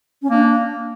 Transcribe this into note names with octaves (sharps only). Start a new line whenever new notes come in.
C#4
A#3 D4